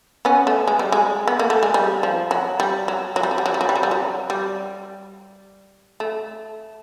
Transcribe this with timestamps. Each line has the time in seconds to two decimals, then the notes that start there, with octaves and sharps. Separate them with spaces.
0.25 B3 C#4
0.47 A3
0.67 G#3
0.79 G3
0.92 G#3
1.28 B3
1.39 A#3
1.50 A3
1.63 G#3
1.74 G3
2.03 F3
2.31 F#3
2.60 G3
2.88 F#3
3.16 F#3
3.23 G3
3.31 F#3
3.38 G3
3.46 F#3
3.54 G3
3.61 F#3
3.69 G3
3.76 F#3
3.83 G3
3.91 F#3
4.30 G3
6.00 A3